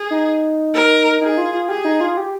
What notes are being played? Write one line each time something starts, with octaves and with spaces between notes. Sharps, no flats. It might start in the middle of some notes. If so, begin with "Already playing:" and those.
Already playing: G#4
D#4
A#4
D#4 G#4
F4
F4
G4 G#4
D#4
F4
G4